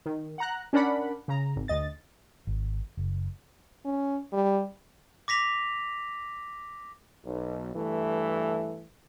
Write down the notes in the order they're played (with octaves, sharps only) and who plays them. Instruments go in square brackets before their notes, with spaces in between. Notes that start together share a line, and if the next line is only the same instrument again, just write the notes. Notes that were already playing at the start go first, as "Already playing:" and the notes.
[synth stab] D#3
F#5 A#5 F#6
C#4 D4 A#4 D5 F#5 B5
C#3 A#5
G#1
D2 D#5 A6
[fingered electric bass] G#1
F#1
[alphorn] C#4
G3
[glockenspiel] D6 A#6 B6 F7
[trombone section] B1
G2 E3 A3